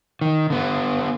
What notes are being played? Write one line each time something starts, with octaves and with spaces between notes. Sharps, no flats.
D#3
D3 B3